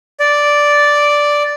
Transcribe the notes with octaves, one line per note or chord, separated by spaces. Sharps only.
D5